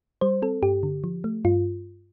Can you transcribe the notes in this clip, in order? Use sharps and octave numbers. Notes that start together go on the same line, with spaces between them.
G3 C5
C4 A4
G2 G4
D3
F3
A3
G2 F4